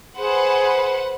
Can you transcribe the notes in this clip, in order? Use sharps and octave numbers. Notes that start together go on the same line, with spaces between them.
G#4 B4 C5 F#5